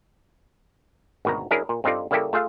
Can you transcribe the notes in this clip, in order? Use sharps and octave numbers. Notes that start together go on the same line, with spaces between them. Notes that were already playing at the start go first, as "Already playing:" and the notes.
G#1 D2 B2 D#3 A#5
F#3 C#4 D4 E4 G#4 A#4
A#2
G2 C4 D#4 F4 A4 D5
C#3 G3 A#3 E4 G4 A4
A3 F4 G#4 E5 F5